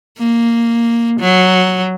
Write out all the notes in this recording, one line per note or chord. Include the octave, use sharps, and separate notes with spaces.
A#3
F#3